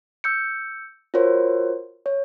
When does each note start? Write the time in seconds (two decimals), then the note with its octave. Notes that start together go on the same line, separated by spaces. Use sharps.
0.24 E6 G6 C#7
1.14 F4 F#4 A#4 C5 C#5
2.06 C#5